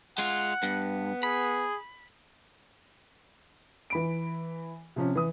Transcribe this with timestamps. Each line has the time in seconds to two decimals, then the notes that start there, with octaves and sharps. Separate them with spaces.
0.18 G#3 F4 F#5
0.63 G2 B3
1.23 G#4 B5
3.90 E3 B5 D7
4.96 C3 F3 C#4
5.15 E3 D#6